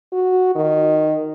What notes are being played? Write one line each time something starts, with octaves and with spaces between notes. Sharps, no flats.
F#4
D#3